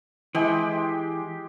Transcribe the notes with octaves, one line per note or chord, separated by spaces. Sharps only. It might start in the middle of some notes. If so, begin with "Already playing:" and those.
E3 G#3 G4 G5